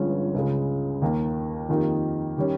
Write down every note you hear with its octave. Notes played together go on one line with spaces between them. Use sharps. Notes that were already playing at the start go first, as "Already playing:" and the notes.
Already playing: G1 G2 F3 G#3 C#4
C#2 C#3 G#3
D#2 D#3 A#3
F2 D#3 A#3 D#4 G4
D#3 G3 C#4